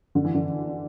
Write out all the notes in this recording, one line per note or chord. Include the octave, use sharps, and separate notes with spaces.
D3
E3
D3